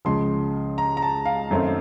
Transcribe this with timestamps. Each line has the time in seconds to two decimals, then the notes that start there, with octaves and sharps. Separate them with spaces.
0.05 C#2 C#3 F3 C6
0.78 A#5
0.97 A#5
1.02 A5
1.25 F5
1.51 F#2 D#3 A3 C4 D#4